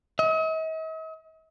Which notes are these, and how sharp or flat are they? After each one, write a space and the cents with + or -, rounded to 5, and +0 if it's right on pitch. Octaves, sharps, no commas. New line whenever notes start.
D#5 +45